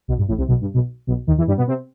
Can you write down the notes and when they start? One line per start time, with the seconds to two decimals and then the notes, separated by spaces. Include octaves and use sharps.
0.08 B1 B2
0.18 G2
0.28 A1 A2
0.38 C2 C3
0.48 B1 B2
0.61 G2
0.74 B1 B2
1.07 B1 B2
1.27 D#2 D#3
1.37 E2 E3
1.47 G2 G3
1.57 B2 B3
1.67 C3 C4